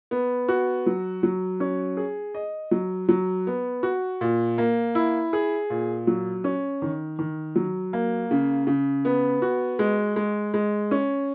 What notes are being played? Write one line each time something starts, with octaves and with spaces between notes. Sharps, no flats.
B3
F#4
F#3
F#3
C#4
G#4
D#5
F#3
F#3
B3
F#4
A#2
A#3
E4
G#4
A#2
F#3
C#4
D#3
D#3
F#3
A#3
C#3
C#3
B3
F#4
G#3
G#3
G#3
C#4